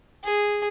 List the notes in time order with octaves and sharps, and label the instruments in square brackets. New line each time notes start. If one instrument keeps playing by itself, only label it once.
[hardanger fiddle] G#4